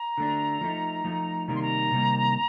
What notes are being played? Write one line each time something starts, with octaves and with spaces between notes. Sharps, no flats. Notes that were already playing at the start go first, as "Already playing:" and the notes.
Already playing: A#5
D3 A3 D4
F3 A3 D#4
F3 A3 D#4
C3 D#3 G3 A#3 D#4 A#5
C6
A#5
C3 D#3 G3 A#3 D#4